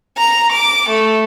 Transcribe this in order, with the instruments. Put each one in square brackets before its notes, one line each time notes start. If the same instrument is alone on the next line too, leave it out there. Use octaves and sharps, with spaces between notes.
[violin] A#5
D6
A3